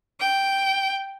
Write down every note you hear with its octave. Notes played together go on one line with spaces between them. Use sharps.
G5